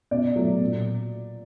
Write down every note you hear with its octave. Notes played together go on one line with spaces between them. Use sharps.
B2 D5
F#3 A3
A#2